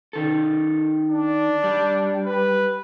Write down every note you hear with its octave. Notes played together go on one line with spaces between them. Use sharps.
D#3 A4
D4
G3
B4